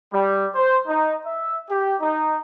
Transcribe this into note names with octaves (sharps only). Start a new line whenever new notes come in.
G3
C5
D#4
E5
G4
D#4